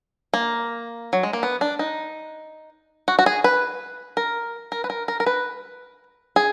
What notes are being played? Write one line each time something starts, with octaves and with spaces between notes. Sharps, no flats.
A#3
F#3
G#3
A#3
B3
D4
D#4
F#4
F#4
G#4
B4
A#4
A#4
B4
A#4
A#4
A#4
B4
G#4